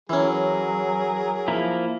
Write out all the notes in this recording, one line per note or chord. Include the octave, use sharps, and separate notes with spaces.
E3 F#3 C#4 G#4 A#4
F3 A#3 E4